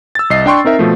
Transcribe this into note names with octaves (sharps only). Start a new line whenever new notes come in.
E6 A6
C2 D#5 C7
D4 G5 C6 C#6
C4 D#4 A#4 E5
B2 F3 A3